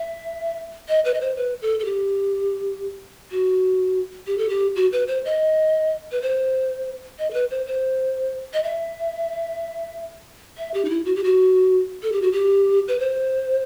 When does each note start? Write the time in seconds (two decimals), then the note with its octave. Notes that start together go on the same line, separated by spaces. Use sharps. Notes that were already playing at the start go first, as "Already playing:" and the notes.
Already playing: E5
0.88 D#5
1.05 B4
1.14 D#5
1.21 C5
1.37 B4
1.62 A4
1.79 A4
1.85 G4
3.31 F#4
4.27 G4
4.38 A4
4.49 G4
4.76 F#4
4.92 B4
5.08 C5
5.25 D#5
6.12 B4
6.22 C5
7.19 D#5
7.31 A4
7.34 B4
7.51 C5
7.66 C5
8.53 D#5
8.63 E5
10.58 E5
10.74 G4
10.85 D#4
10.90 E4
11.05 F#4
11.16 G4
11.24 F#4
12.03 A4
12.12 G4
12.22 F#4
12.32 G4
12.88 B4
12.99 C5